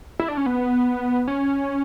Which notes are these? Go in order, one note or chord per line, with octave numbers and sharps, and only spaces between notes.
E4
D4
C#4
B3
C#4